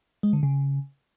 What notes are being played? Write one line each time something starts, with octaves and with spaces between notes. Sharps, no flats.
G#3
D3
C#3